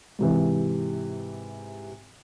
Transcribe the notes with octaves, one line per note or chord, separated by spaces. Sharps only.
G#2 C3 E3